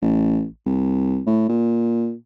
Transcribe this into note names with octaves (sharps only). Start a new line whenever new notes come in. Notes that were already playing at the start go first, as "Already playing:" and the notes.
A1
C2
A2
A#2